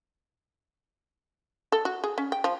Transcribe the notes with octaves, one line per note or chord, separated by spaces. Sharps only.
A4
F#4
G#4
C#4
G5
F3